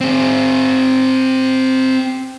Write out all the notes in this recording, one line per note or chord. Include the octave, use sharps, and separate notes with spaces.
C4 G#4